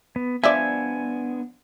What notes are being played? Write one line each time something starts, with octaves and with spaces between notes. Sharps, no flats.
B3
F3 B3 D4 D5 E5 G#5